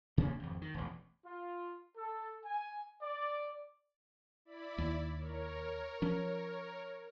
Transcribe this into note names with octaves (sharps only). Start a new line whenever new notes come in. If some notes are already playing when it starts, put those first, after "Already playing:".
C3 A#3 C#4 D4
G#1 F2
D#3
E1 A1
F4
A4
G#5
D5
E4 D5 B5
D#2
A#4 C#5
F3 C#4